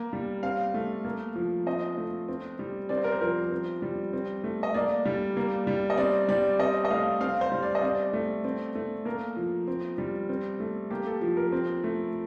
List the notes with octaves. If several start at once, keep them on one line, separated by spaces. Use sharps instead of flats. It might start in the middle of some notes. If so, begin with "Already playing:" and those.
Already playing: A#3
G3
C4 F5
A3
A#3
F3
C4 D#5
A3
C4
G3
C4 D5
C5
A#4
C5
F3 A#4
C4
G3
C4
A3
D#5
A#3 D5
G3
A#3
G3
D#5
C4 D5
G3 D5
C4 D#5
D#5
A3 F5
C4 F5
C5
G3
D5
D#5
C4 D5
A3
C4
A3
A#3 A#4
F3
C4
G3
C4
A3
A#3 G4
A4
F3
A#4
C4
A3